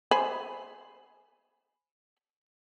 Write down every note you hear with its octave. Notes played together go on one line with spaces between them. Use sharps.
C5 G#5 B5